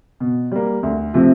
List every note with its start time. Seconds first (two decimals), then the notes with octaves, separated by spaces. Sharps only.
0.20 B2
0.52 G3 A#3
0.83 D2
1.14 C3 F3 A3 C4